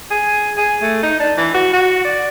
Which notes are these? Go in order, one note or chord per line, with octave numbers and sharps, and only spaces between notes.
G#4
G#4
A3
D#4
D4
E3
F#4
F#4
D5